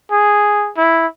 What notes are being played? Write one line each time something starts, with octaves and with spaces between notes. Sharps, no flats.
G#4
E4